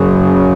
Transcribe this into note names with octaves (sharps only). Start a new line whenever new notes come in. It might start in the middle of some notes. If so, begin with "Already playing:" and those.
Already playing: F#1 F#2 C#3